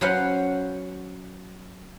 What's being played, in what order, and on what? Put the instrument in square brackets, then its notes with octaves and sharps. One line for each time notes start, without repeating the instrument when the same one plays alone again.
[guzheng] F#3 C#4 B4 C5 F5 F#5